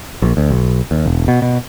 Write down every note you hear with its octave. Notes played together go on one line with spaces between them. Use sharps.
A#1
D2
B1
D#2
E1
B2
B2